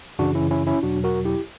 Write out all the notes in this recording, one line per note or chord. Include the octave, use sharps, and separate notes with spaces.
F#2 C#3 E3 D4 F#4
C#4 E4
C#4 E4
C#4 E4
E2 B2 F#3 D4 F#4
F#4 A#4
E4 G4